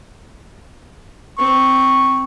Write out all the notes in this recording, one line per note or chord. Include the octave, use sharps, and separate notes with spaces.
C4 C#6